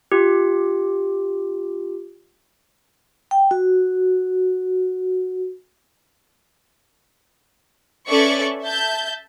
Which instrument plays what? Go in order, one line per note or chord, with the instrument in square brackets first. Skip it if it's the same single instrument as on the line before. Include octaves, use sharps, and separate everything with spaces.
[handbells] F4 G4
[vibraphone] G5
F#4
[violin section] C#4 A4 B4 D5 E5 C#6
E5 A5 G6